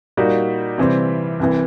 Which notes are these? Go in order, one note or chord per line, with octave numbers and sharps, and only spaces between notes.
A#2 G3 A#3 D#4 F#4
C3 E3 G3 C4
C2 C3 E3